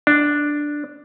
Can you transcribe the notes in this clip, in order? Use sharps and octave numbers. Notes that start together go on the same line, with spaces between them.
D4